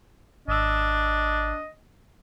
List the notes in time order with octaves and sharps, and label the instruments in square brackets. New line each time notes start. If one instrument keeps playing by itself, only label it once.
[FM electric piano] G#1 E6 [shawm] D4 [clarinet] D#5